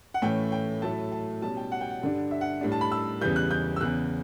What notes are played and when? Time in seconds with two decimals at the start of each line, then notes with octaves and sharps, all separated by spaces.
0.14 F#5
0.22 A2 E3 A3 C#4 E4 G5
0.52 G5
0.82 A2 F#3 A3 E4 A5
1.12 A5
1.42 B2 G3 C#4 A5
1.57 G5
1.72 F#5
1.81 G5
1.90 F#5
2.02 G2 D3 G3 D4
2.31 E5
2.41 F#5
2.61 A2 G3 D4
2.72 A5
2.81 B5
2.92 E6
3.21 E2 C#3 E3 G3 G6
3.36 F#6
3.51 G6
3.76 E6
3.81 E2 C#3 E3 F#6